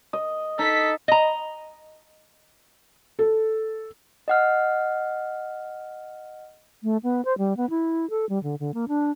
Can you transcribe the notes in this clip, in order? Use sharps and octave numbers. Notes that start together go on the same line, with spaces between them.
D#5
D#4 A4 B6
D#5 A#5
A4
D#5 F#5 F6
A3
B3
C5
G3
B3
E4
A4
G3
D3
D3
A#3
D4